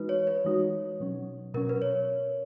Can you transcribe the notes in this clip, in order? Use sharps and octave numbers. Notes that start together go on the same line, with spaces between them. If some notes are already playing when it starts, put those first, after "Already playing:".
Already playing: E3 G#3 D#4 F#4 B4
C#5
B4
E3 G#3 D#4 F#4
B2 F#3 C#4
B2 F#3 C#4 A#4
B4
C#5